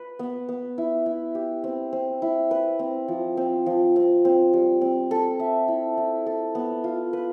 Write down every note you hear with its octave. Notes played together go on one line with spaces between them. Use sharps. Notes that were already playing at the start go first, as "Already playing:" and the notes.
Already playing: B4
B3
B3
E4
E4
G4
C4
C4
E4
B4
C4
F3
C4
F3
C4
C4
G3
C4
A4
E5
E4
E4
A4
B3
F4
B4